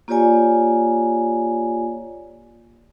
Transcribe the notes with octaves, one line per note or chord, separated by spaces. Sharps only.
A#3 F4 G4 C#5 D5 G#5